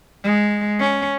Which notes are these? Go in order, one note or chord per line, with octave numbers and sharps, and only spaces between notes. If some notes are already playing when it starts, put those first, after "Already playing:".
G#3
C#4